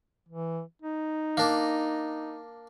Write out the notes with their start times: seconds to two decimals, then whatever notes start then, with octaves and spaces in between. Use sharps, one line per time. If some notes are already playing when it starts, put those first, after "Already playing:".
0.29 E3
0.82 D#4
1.37 A#3 D4